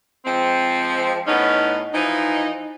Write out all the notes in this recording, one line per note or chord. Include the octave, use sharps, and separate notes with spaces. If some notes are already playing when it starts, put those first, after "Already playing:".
F3 G#3 C4
A2 B3 C#4 D#4
E3 F3 D#4